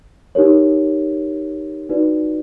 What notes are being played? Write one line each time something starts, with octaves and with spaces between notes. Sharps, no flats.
D#4 G4 A#4 C#5
D#4 F#4 B4 D5